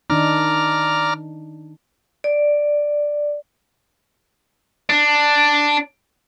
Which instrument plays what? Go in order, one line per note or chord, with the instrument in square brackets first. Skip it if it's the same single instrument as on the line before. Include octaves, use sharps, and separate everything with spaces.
[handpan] D#3 D4 D#4 [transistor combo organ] D5 A#5 F6
[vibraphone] D5
[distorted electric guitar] D4